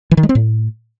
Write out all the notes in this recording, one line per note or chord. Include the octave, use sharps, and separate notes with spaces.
E3
D#3
G#3
C4
A2